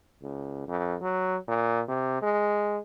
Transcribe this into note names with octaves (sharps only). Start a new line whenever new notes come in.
C#2
F2
F#3
A#2
C3
G#3